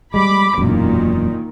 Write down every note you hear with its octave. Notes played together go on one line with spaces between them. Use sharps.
G3 G#3 B5 D6
E1 F#2 A#2 D#3